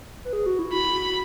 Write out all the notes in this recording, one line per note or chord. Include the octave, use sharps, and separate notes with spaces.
B4
G#4
F#4
E4
F#4 B5